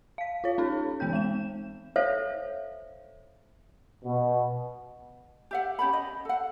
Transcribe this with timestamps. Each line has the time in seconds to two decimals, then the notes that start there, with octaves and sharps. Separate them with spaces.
0.18 F5 B6
0.44 F4 C#5
0.58 C#4 D#4 A4
1.00 E3 B3 G5 G6
1.13 G#3 E7
1.96 A4 C5 C#5 E5 F5
4.05 B2
5.51 G4 E5 F#5
5.79 C#4 G4 C#5 B5
5.93 D#5
6.25 A4 F#5